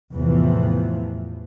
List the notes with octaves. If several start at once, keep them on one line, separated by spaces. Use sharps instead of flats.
E2 A2 C3 E3 F3